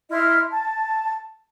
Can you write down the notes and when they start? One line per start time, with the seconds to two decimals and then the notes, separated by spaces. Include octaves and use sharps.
0.11 E4 D#5 C6 F6
0.50 A5